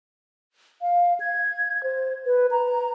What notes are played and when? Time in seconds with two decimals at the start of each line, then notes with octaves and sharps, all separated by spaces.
0.82 F5
1.20 G#6
1.83 C5
2.26 B4
2.51 A#5